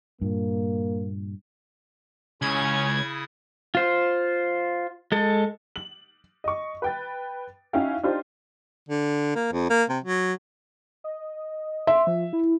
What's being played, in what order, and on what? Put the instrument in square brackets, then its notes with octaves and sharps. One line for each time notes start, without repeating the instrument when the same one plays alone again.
[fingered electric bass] G2 A#2 [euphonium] A#3
[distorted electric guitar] C#2 [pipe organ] C#3 E4 D#6 [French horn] C#4 [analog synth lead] G#6
[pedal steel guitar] F4 C5
G#3 A4
[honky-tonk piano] F#7
D#5 C#6
B4 G5 A6
C#4 D#4 E4 F#4 F5 G5
D4 D#4 F4 G4 C5
[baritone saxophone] D3
A#3
F2
A#3
C3
F#3
[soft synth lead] D#5
[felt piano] E5 [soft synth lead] C6
[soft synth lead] F3
E4